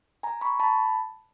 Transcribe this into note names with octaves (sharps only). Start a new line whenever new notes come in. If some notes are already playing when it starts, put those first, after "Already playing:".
G#5 A#5
B5 C#6
A5 B5